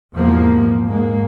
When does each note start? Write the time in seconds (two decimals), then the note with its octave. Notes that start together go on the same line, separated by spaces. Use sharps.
0.14 E2 G#2 C3 F3 A#3
0.87 G#2 G#3 A#3